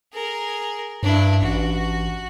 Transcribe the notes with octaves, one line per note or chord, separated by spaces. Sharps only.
G#4 A#4
G2 D4 E4
A1 F#4